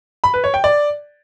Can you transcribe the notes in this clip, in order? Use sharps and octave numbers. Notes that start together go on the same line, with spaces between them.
B5
B4
C#5
G5
D5